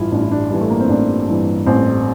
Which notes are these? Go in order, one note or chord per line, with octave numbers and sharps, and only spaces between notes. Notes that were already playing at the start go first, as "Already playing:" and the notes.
Already playing: A1 G2 E3 E4 F4
A1 D4
E4
D4
G2 E3
A3
A#3
C4
A1 D4
G2 E3
A1 C4